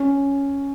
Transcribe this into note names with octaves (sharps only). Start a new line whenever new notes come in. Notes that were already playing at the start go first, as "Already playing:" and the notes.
Already playing: C#4